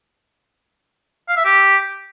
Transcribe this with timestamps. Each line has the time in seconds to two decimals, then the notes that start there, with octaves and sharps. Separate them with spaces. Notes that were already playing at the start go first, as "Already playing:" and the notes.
1.28 F5
1.37 E5
1.45 G4